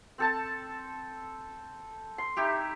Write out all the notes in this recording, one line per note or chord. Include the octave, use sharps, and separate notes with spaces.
C4 A4 A5
C6
D#4 E4 G4